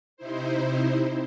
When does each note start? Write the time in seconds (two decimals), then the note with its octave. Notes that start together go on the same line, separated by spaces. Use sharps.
0.17 C3 D#4 E4 C5